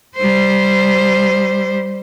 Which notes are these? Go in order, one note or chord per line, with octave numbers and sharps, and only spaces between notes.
G3 C5